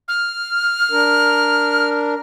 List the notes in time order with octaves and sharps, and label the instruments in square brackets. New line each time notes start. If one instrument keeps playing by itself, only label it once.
[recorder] F6
[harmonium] D4 A#4